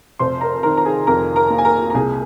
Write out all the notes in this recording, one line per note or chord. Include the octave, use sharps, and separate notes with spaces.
F1 C5 C6
A#4 A#5
D#3 A#4 A#5
A#5
G#4 G#5
F2 A#4 A#5
A#4 A#5
A#3
G#5
A#4 A#5
A#5
C2 G#4 G#5